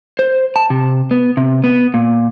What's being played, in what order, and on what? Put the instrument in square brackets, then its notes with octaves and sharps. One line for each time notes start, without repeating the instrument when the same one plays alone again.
[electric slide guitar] C5
A5
C3
B3
C3
B3
A#2